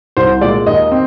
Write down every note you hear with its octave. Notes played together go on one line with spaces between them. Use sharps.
C2 C5
A#2 G#3 D5
D#2 D#5
C4